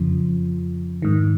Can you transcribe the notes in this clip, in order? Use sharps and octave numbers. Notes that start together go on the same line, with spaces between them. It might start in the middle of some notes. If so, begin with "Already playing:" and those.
Already playing: F2 C#3 F3
G#2 D#3